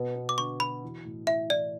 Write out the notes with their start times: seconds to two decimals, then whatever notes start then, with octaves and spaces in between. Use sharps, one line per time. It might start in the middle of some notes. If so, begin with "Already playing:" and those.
Already playing: B2 B3
0.15 B3
0.29 D6
0.38 D3 C#6
0.60 F#4 B5
0.83 E3
1.05 A2
1.27 E4 E5
1.49 E3 D5